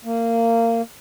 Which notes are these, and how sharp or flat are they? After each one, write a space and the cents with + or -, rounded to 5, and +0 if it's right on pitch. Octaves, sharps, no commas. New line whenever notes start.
A#3 -20